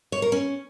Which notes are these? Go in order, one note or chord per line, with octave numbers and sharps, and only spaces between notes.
C#5
A#4
C#4